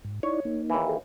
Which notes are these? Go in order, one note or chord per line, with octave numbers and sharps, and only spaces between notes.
G#2
D#4 E4 C#5 D5
A#3 D#4
D#2 E3
G#4 A4